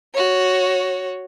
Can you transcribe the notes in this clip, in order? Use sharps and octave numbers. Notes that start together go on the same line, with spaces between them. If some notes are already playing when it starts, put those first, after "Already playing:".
F#4 C#5